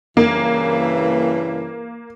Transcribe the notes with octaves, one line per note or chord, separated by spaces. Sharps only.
G2 C#3 E3 A#3